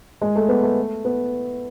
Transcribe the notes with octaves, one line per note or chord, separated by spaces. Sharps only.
G#3
A3
B3
A3
B3